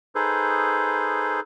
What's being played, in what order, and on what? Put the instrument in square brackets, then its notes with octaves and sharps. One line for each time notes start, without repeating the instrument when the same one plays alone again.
[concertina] D#4 G#4 A4 B4 C5